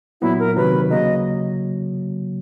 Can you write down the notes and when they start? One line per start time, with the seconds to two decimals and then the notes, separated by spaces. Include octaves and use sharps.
0.21 A#2 F#3 B3 E4
0.39 A#4
0.56 C3 D#3 F#3 B4
0.90 C#3 F#3 A#3 D#5